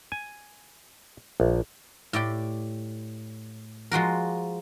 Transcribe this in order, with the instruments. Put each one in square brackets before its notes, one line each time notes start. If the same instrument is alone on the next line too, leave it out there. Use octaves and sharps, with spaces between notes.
[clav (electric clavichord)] G#5
A#1
[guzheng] A2 G4 D5 G5
F3 G#3 F#4 A#4